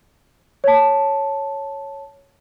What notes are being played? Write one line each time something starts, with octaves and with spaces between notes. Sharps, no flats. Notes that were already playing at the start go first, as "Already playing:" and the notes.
C#5 A5